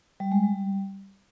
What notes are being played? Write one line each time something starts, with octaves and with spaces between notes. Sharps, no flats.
G3
G#3
G3